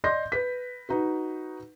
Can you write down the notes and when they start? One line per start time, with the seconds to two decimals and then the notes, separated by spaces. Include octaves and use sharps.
0.04 D5 D#5 C6 G6 A#6
0.32 B4 B6
0.89 D#4 F#4 B4